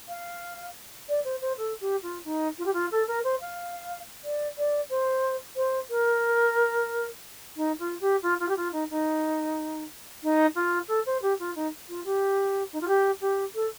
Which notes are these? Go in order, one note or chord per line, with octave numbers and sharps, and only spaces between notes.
F5
D5
C5
C5
A4
G4
F4
D#4
F4
G4
F4
A4
A#4
C5
F5
D5
D5
C5
C5
A#4
D#4
F4
G4
F4
F4
G4
F4
D#4
D#4
D#4
F4
A4
C5
G4
F4
D#4
F4
G4
D#4
F4
G4
G4
A4